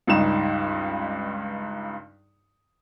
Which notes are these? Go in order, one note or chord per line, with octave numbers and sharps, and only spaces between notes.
C#2 G2 D#4 E7